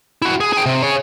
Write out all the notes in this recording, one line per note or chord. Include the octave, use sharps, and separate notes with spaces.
E4 F#4
G#4
G#4 G5
C3
G#4 C#5